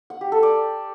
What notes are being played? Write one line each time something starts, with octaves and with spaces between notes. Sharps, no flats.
F#5
G4
A4
D5